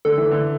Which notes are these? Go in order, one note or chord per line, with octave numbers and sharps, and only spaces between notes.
D3 A4
E3
D3